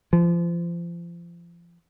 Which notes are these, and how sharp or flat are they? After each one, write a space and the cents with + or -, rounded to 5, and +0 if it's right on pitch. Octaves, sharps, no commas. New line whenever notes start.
F3 -30